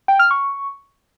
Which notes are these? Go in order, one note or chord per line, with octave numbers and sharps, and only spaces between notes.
G5
F6
C#6